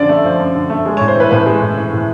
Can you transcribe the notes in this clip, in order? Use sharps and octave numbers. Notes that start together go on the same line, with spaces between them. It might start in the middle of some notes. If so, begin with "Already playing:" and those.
Already playing: F#2 D3 F3 D5
A3
F3
F#2
D3
A3
G#3
C#5
A2
C5
E3 B4
A2 B4
G#3
A2
E3
A2